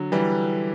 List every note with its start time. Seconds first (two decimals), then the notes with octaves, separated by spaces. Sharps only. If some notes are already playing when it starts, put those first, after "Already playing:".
Already playing: D3 F#3
0.12 E3 G3